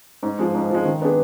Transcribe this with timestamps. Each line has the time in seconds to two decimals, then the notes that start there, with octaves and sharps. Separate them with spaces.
0.23 G#2
0.39 F3 G#3
0.55 G#2
0.70 F3 G#3
0.85 D#3
1.02 B3 D4 G#4